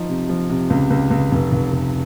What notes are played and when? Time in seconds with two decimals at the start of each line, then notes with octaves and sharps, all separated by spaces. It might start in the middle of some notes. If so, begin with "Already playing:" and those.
Already playing: F3 D#4
0.09 C3
0.29 F3
0.49 C3
0.70 C#2
0.90 C#2
1.11 C#2
1.31 F1
1.52 F1
1.72 F1